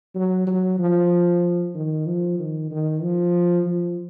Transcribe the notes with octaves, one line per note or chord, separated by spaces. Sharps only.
F#3
F#3
F3
D#3
F3
D#3
D#3
F3
F3